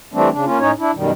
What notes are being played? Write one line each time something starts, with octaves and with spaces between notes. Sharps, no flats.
E3 G3 A3 C4 D4
C#3 D4
A#3 C#4 F4
A2 C#4 D#4 C#5
D4 E4
F#2 B2 D#3 G3